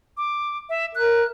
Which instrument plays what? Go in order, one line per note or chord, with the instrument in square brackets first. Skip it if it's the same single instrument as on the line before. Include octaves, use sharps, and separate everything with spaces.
[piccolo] D6
E5
[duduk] A#4 [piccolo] F#6